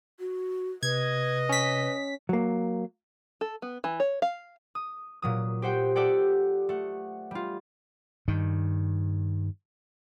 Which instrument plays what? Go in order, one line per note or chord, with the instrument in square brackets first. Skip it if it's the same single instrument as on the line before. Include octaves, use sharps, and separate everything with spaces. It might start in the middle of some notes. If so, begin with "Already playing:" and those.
[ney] F#4
[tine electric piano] C3 [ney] B4 [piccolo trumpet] D#5 [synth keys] G#6
[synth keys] C#4 B6
[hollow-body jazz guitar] F#3 A#3
[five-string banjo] A4
B3
E3
C#5
F5
[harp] D#6
A#2 F#3 D#6
G4 C5 F#5 G5
G4 A4 D5 F#5 G5
A3 F#5
G3 F4
[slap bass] G2 D#3